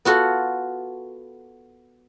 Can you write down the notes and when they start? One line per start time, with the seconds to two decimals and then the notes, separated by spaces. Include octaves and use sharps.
0.05 B3 F4 F#4 A4